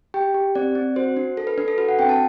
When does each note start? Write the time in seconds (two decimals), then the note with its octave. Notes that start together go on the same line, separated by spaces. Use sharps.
0.14 G4 G5
0.34 G4
0.55 C4 D5
0.75 C4
0.96 F#4 C5
1.17 D4
1.37 A4
1.47 B4
1.58 D4 B4
1.68 A4
1.78 F#4 B4
1.89 F#5
1.99 C4 G5
2.09 A5